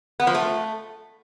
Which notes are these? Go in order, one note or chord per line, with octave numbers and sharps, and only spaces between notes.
B3
F3
A3